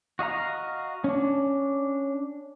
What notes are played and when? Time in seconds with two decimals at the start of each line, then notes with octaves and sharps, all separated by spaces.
0.19 F#4 D#5 F5 A#5
1.04 C#4 D4